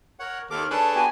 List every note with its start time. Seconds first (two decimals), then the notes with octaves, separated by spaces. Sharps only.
0.20 A#4 C#5 F#5
0.51 D#2 A4 D6 F6
0.71 D4 G#4 A4 B4 C#5 A5
0.95 B3 F#4 G4 G#5